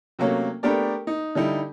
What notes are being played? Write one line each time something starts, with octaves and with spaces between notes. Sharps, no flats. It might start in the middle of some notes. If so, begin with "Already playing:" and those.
C3 F#3 A3 A#3 C#4
A3 B3 D4 G4 A#4 D5
D#4
D3 G3 D#4 E4